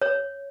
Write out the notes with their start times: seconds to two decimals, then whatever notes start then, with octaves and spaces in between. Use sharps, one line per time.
0.02 C#5